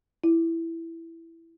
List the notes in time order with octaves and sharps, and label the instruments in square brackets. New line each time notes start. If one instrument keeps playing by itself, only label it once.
[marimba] E4